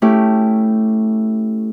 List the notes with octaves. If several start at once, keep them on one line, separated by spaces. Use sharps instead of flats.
A3 C#4 E4 G4